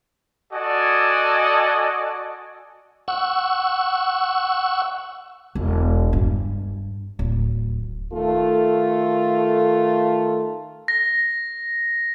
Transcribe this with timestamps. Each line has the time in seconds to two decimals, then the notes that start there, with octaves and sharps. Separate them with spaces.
0.52 F#4 A4 D5 D#5 G#5
3.08 F#5 C#6 E6
5.55 E1
6.13 G2
7.19 D1
8.13 D#3 A3 F4 A4
10.88 A#6